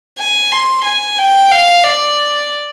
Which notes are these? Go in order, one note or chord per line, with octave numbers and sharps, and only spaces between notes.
G#5
C6
G#5
G5
F5
D5